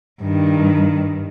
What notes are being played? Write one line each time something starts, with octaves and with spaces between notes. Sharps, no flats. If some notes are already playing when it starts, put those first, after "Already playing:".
G2 D#3